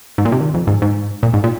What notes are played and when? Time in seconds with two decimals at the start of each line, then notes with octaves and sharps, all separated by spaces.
0.18 G#2
0.25 A#2
0.32 C3
0.41 D#3
0.54 F2
0.67 G#2
0.82 G#2
1.23 A#2
1.34 G#2
1.44 A#2